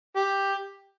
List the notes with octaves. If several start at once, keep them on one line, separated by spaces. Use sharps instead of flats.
G4